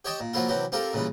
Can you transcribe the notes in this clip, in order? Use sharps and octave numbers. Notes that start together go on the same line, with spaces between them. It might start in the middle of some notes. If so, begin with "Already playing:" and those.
G4 C#5 D#5 G5 A5 D#6
A#2
F3 F#3 A#3 E4 F4
C3 E3 F#3 G4
C4 F4 G4 A4 A#4
A#2 C#3 E3 G3